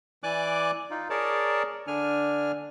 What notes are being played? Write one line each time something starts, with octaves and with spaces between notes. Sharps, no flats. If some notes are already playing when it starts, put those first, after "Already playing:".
E3 D5 G#5 D6 F#6
D#4 F4
G#4 A#4 C#5 D5 A5
D3 D4 G#5 F6